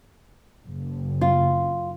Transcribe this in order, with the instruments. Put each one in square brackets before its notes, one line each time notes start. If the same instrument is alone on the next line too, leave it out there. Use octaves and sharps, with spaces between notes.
[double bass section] F#1
[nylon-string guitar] F4